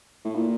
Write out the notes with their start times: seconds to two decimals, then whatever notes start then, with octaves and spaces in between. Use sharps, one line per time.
0.24 A2
0.35 A#2